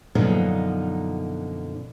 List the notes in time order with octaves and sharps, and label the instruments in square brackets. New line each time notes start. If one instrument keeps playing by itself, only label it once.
[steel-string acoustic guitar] F#2 B2 D3 F3 A#3 D#4